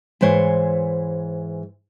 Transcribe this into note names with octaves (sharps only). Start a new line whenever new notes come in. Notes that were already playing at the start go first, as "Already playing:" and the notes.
G#2 E3 C5 C#5